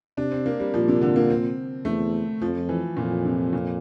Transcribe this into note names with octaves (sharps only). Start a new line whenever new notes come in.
C3 D4
C4
A#3
G3
A#2 F3
C3
D3
A#3
C4
E2 A3
F2 F3
E3
F2 A#2
C3
A#2